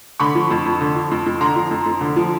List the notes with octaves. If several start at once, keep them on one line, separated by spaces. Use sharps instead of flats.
D3 B5 C#6
F3
F2
F2
D3
F3
F2
F2
D3 A#5 C6
F3
F2
F2
D3
F3